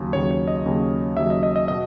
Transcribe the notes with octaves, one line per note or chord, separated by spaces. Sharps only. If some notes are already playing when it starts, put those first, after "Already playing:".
Already playing: D#2 C#3 F#3
D#2 C#3 F#3 C#5
C#5
D#5
D#2 C#3 F#3
D#2 C#3 F#3 E5
D#5
D#5
D#5
B2 D#5